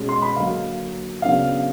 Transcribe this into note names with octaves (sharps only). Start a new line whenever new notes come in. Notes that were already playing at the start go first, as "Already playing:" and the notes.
Already playing: B2 G#3 C#4
C6
B5
D3 F#3 A#3 F5
C#3 F#3 B3 D4 F5